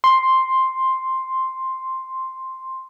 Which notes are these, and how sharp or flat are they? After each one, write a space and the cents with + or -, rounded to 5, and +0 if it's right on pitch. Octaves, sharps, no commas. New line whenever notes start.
C6 +5